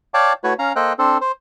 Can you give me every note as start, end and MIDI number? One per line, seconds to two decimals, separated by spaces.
0.14 0.33 73
0.14 0.33 74
0.14 0.33 77
0.14 0.33 79
0.14 0.33 81
0.14 0.33 86
0.44 0.54 57
0.44 0.54 64
0.44 0.54 66
0.44 0.54 71
0.44 0.54 73
0.59 0.73 61
0.59 0.73 77
0.59 0.73 82
0.76 0.93 58
0.76 0.93 69
0.76 0.93 72
0.76 0.93 75
0.76 0.93 79
0.76 0.93 90
0.99 1.18 60
0.99 1.18 62
0.99 1.18 69
0.99 1.18 72
1.21 1.32 72